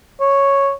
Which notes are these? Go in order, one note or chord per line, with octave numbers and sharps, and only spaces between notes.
C#5